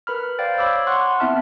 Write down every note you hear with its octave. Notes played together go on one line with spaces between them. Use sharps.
A#4 B4 B5 F6
C5 D5 F5 G5 A6
C#5 B5 D6 E6
F#5 C6 C#6 F#6
B3 C4 E4 E5 A5 F6